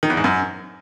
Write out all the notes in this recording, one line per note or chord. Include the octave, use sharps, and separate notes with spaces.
D#3
E2
G#2
F#2